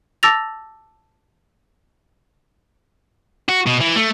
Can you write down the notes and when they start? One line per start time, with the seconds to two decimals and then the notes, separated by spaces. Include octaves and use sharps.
0.23 A5 D6 E6 A6 A#6 F7
3.49 F#4
3.67 B2
3.81 E3
3.96 A3